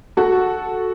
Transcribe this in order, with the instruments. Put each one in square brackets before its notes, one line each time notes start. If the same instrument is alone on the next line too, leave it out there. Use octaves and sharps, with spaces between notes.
[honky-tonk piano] F#4 A4